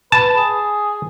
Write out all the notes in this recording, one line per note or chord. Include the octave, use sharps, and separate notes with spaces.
B4 A5
G#4